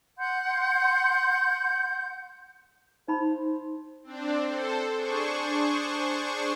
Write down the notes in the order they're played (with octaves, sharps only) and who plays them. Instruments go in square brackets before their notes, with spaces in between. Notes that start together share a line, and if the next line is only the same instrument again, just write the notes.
[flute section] F#5 C6 G6
[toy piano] D#4 B5 [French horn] C5
[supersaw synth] C4 D4
A4 C5
D4 G#4 C5 C#6